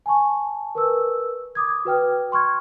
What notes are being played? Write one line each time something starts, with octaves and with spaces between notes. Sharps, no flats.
G#5 A5 C#6
A#4 B4 E6
D6 D#6 G#6
F#4 B4 G5 F6
C6 C#6 F6 G#6